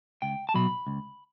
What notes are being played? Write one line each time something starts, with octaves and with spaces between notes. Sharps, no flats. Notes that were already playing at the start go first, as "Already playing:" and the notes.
C#2 G5
A5
B2 F#3 B5
C#2